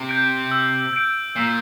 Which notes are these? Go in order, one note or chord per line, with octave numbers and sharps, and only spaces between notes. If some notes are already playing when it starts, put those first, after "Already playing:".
Already playing: C3
G6 D7
E6
G6 D7
A#2 E6